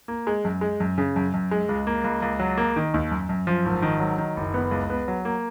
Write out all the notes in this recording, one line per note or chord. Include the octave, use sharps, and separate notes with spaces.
A#3
G#3
F#2
G#3
F#2
C#3
F#2
F#2
G#3
C#2
A#3
C#2
C#2
F#3
A#3
D#3
D#2
F#2
F#2
F3
G#1
D#3
F#3
D#3
F#1
B3
C#2
B3
F#3
A#3